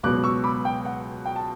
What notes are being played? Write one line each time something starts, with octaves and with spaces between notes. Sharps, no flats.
C#2 B2 F#3 B3 D6 F#6
C#6 E6
B5 D6
G5
F#5
G5
A5